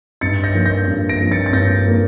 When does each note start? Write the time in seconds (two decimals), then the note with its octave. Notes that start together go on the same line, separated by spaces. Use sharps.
0.21 G2 A6 C#7
0.43 G6 A#6
0.54 F3 A#3
0.66 G6 A#6
0.87 G2
1.09 A#6 D7
1.21 F3 A#3
1.31 A6 C#7
1.46 A6
1.53 G2 G6 A#6
1.86 F3 A#3